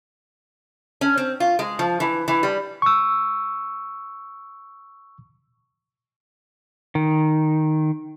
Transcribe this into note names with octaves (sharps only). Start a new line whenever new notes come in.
C#4
C4
F4
G#3
F3
E3
E3
G3
C#6 E6
D#3